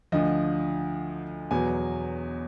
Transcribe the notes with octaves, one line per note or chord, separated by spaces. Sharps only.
D2 D3 F3 D#5
E2 B2 F#3 G#5